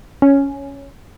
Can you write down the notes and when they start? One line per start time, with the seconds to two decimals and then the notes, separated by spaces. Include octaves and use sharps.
0.22 C#4